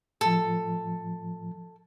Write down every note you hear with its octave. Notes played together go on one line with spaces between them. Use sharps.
A2 F3 A4